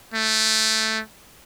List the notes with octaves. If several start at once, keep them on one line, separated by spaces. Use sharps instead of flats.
A3